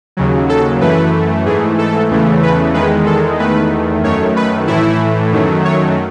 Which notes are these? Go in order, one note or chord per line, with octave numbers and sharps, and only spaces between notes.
D#2 C#3 F#3
A4
F#2 E3 A3 B4
G#2 E3 A3 G#4
A4
E2 C#3 E3 A3
B4
E2 D#3 G#3 B4
A4
E2 D#3 A3 B4
F#2 D#3 A3 C#5
B4
A2 E3 A3 E4
F#2 D#3 F#3 A3
C#5